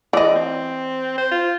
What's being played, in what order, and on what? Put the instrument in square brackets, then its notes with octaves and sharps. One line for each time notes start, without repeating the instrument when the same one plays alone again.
[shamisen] E3 D#5 [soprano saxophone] D5
[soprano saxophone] C4
C5
F4